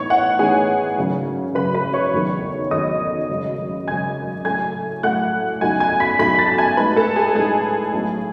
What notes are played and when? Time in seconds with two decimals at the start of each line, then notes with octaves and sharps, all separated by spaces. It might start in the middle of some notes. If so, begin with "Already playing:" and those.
Already playing: A2 E3 B3 D#4 C#5 C#6
0.10 F#5
0.39 A2 E3 B3 D#4 G#4 G#5
0.97 G#1 F#2 C#3 F#3
1.55 G#1 F#2 C#3 F#3 B4 B5
1.74 B4 B5
1.94 C#5 C#6
2.13 F#1 E2 D#3 F#3 A3
2.71 F#1 E2 D#3 F#3 A3 D#5 D#6
3.29 G#1 F#2 C#3 G#3
3.87 G#1 F#2 C#3 G#3 G#5 G#6
4.45 A2 F#3 A3 G#5 G#6
5.03 A2 F#3 A3 F#5 F#6
5.61 C#2 B2 F#3 A3 D#4 G#5 G#6
5.80 G#5 G#6
6.00 B5 B6
6.19 C#2 B2 F#3 A3 D#4 B5 B6
6.38 A5 A6
6.58 G#5 G#6
6.77 A2 G#3 D#4 B4 B5
6.96 A4 A5
7.16 G#4 G#5
7.35 A2 G#3 D#4 G#4 G#5
7.94 B1 A2 F#3